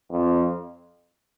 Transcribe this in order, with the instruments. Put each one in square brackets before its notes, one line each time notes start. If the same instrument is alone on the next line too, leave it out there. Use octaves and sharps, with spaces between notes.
[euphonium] F2